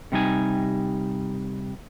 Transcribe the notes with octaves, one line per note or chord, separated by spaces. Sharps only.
C3 G3 D#4 G#5